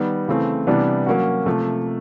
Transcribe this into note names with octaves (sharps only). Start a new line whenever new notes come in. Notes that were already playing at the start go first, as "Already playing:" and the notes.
Already playing: D#3 G3 B3
C#3 E3 A3 C4
C3 E3 G3 B3 D4
F#3 A#3 C#4 F#4
C3 F3 A3